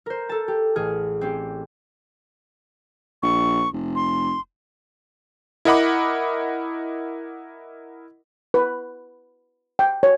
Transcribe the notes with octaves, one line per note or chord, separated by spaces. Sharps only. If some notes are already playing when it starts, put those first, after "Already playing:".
A#4 C5
A4 A5
G4
A1 G#4 F6
C4 C#4 G4
A#1 C#6
F1
C6
E4 A#4 D#5 F#5 B5 D6
B4
G5
C#5